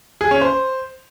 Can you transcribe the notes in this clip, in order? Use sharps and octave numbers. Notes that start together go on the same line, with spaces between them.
G#4
C#4
C5